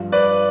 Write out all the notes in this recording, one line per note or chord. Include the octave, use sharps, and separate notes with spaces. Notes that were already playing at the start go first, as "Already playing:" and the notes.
Already playing: G2 F3
B4 D5